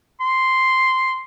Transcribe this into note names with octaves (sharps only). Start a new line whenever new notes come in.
C6